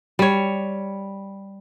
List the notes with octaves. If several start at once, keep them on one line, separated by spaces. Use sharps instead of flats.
G3 C#5